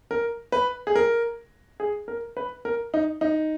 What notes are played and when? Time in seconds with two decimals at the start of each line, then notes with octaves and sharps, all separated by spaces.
0.11 A#4
0.52 B4
0.87 G#4
0.95 A#4
1.80 G#4
2.08 A#4
2.37 B4
2.65 A#4
2.94 D#4
3.21 D#4